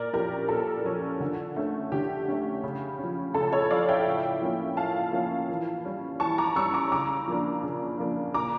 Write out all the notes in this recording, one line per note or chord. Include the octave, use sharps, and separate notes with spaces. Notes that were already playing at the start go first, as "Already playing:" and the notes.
Already playing: A#2 A#4 D5
F3 C#4 G4 A#4
A#2 A4
F3 C#4
D3
A3 C#4
D3 G4
A3 C#4
C#3
F3 C#4
C#3 A4
A4 C#5
F3 C#4 D5 F5
E5 G5
A2
F3 A#3 C#4
A2 F5 A5
F3 A#3 C#4
E3
G3 C#4
E3 A5 C#6
A#5 D6
G3 C#4 C#6 E6
A#5 D6
C#3 A#5 D6
F3 A#3 D4
C#3
F3 A#3 D4
A#2 A#5 D6